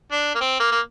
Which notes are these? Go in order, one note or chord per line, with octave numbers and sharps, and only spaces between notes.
D4
A#3
C4
A#3
A#3